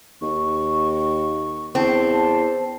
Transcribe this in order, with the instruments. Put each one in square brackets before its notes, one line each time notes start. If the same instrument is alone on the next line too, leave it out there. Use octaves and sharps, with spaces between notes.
[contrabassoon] D#2 [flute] C#6
[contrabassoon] E2 [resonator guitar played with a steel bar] C4 [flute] A5